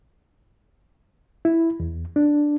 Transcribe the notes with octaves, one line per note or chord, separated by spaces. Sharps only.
E4
E2
D4